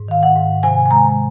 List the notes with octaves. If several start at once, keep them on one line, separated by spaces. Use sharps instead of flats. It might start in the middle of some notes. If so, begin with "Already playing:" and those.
Already playing: G#2
D#3 F5
F#5
G#2
C3 G#5
G#5
G#3 A#5